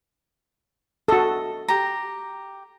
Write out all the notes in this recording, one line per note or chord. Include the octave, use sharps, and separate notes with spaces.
F#4 A4 D#5
G4 A#5